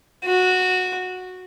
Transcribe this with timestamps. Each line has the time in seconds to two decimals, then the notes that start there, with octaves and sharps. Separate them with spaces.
0.25 F#4